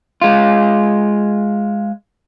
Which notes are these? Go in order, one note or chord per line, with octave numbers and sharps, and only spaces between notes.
G#3 F4